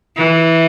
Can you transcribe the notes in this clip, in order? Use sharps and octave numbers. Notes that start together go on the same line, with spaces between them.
E3